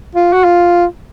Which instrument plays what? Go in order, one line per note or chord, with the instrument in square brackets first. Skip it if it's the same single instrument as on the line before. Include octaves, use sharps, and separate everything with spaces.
[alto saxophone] F4
F#4
F4